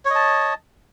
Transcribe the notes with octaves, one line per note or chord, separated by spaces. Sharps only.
C#5 D#5 A5